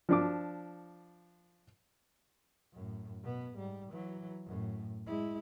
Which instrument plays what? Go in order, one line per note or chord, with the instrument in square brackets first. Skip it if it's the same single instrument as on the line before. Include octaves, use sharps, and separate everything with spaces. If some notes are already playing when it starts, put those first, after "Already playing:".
[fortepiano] F3 D4 D6
[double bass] F#2 A2
B2 B3
G#2 G3
E3 F#3
F#2 A2
G#3 E4